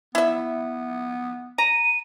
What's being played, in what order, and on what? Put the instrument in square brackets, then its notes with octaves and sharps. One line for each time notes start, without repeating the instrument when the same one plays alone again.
[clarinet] B3 [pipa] E4 E5
[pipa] A#5 [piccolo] D#7